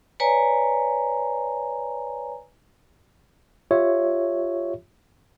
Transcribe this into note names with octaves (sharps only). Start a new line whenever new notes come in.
B4 C#5 D5 G#5 A#5
F4 G4 C#5 E5